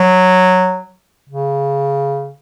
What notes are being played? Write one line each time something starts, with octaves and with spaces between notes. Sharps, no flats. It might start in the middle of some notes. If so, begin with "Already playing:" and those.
Already playing: F#3
C#3